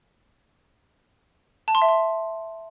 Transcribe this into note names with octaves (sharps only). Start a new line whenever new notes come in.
A5
C6
E5
C6